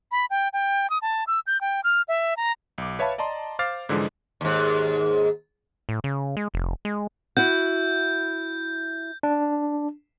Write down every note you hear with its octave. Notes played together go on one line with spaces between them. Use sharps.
B5
G5
G5
D#6
A5
E6
G6
G5
F6
E5
A#5
B1 D6
B4 C#5 E5 F5 A5 B5
D5 D#5 A5 A#5 C6
C5 F5 D6 F6 A6 C7
G#2 D3 E3 F3 G#3
D#2 G#2
A2
C#3
G#3
F1
G#3
E4 F#4 F#5 G6
D4